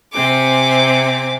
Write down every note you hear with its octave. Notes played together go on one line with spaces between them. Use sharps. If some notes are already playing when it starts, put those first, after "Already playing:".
C3 C4 G#5 D6